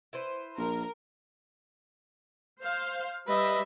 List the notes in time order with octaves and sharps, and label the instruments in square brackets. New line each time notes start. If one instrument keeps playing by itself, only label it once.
[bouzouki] E4 B4 C5
[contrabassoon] A#1 [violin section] A#4
[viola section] C5 F5
[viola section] G3 E5 [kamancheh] B4 D#5